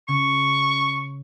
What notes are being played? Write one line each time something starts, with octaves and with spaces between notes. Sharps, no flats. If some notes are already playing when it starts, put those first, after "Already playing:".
C#3 C#6